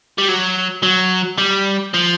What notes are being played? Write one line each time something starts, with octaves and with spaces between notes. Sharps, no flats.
G3
F#3
F#3
G3
F3